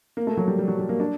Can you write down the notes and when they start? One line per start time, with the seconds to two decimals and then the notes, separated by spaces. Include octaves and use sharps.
0.17 A#3
0.27 A3
0.37 F#3
0.48 G3
0.59 G3
0.68 F#3
0.79 G3
0.89 A#3
1.00 D4